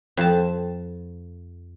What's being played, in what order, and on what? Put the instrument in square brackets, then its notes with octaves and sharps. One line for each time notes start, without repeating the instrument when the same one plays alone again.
[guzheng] F2 A5